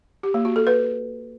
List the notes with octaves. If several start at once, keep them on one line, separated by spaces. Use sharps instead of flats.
G4
A#3
F#4
A4
B4